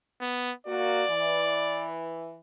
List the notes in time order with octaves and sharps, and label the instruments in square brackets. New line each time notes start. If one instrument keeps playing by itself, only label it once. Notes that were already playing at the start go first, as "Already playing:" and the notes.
[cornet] B3
[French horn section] A#3 F#4 [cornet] D5
[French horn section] E3